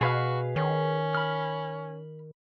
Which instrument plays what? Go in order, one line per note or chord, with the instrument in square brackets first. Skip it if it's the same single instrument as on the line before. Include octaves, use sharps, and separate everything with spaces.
[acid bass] B2 [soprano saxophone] F#4 [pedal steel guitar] G#4 B4 F5
[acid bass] D#3 [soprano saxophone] C#4
[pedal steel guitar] B5 F6